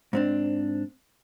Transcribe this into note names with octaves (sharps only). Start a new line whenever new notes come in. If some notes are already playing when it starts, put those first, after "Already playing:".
G#2 C4 D4